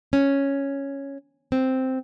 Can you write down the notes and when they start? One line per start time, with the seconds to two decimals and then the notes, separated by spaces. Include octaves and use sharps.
0.13 C#4
1.52 C4